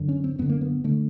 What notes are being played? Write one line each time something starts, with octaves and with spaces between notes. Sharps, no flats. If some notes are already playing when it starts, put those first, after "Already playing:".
Already playing: F#2 D3
C#4
C4
F#2 D3 B3
A#3
B3
D3 A3